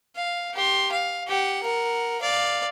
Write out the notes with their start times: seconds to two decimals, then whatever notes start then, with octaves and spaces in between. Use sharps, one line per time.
0.16 F5
0.54 G4 C6
0.92 F5
1.28 G4 F#5
1.63 A#4 F#5
2.21 D5 F5